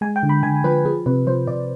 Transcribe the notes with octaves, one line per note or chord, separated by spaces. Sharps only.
G#3 G#5
G5
D3
B5
D3 G#5
F3 B4
F3 G#4
C3 B4
F3 C5
C3 D5